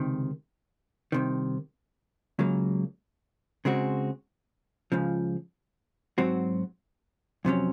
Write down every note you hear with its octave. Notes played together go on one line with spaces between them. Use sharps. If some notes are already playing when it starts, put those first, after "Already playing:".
Already playing: C#2 C3 D#3
C2 C3 D#3
C#2 C#3 F#3 A#3
C#3 G#3 C4 F#4
C#2 C#3 F3
G#2 F#3 C4 F#4
F2 C3 F#3 C#4